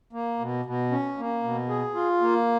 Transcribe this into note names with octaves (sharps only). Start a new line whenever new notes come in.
A#3
B2
B2
C#4
A#3
B2
G#4
F4
A#3